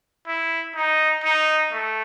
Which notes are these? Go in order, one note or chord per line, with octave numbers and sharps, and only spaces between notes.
E4
D#4
D#4
A3